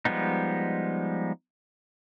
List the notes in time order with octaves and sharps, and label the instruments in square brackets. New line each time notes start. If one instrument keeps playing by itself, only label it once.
[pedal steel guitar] F3 G3 G#3 B3 D#4